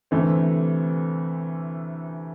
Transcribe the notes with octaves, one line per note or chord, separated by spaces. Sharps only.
D2 C3 E3 A3 C4